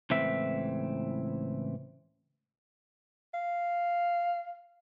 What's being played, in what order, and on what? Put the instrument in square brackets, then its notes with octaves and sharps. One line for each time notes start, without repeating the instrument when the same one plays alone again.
[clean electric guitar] C#2 A2 E3 C4 E5
[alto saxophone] F5